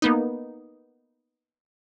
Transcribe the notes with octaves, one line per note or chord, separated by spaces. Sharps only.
A#3 B3 D#4